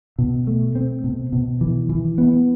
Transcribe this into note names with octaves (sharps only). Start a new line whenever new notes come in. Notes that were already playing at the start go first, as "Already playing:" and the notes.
B2
A3
C4
B2
B2
E3
E3
B3